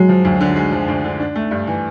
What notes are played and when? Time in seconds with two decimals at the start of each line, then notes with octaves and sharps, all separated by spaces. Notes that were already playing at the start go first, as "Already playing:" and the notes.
Already playing: F#3 G#3
0.09 F3
0.25 D2
0.41 D3
0.56 G#3
0.72 F3
0.88 D2
1.04 D3
1.20 D4
1.36 A3
1.51 G2
1.67 E3